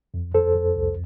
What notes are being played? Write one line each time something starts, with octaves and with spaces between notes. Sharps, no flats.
F2
F2 A4 C5
F2
C2